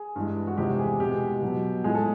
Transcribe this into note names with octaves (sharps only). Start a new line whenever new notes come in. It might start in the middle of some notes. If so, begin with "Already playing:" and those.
Already playing: G#4
G2 E3 G#3
F#4
E2 C3 F3 G#3 G4
G#4
B2 G#3 G4
B2 F#3
A2 F3 G#3 G#4
A4